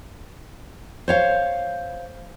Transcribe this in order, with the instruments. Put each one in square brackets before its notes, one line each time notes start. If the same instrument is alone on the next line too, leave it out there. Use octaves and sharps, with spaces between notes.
[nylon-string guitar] C5 C#5 F5